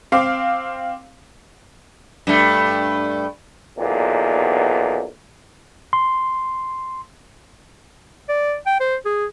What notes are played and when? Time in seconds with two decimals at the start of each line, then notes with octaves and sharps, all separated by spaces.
0.12 C4 F5 D6
2.27 G2 A3
3.79 B1 E2 A#2
5.93 C6
8.29 D5
8.66 G5
8.80 C5
9.06 G#4